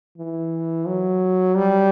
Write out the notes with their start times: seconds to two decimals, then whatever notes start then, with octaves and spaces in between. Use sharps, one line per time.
0.18 E3
0.87 F#3
1.57 G3